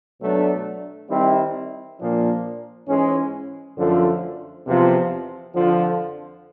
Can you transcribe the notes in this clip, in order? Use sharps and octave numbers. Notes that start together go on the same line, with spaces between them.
B2 F#3 A3 D4
D#3 G3 C4 E4
A#2 F3 A#3 D4
G#2 E3 G#3 C#4
F#2 D3 F3 A3
E2 C3 F3
F2 D3 F3